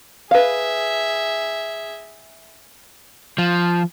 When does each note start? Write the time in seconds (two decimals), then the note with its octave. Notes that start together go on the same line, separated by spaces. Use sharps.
0.31 G#4 B4 E5 F5
3.38 F3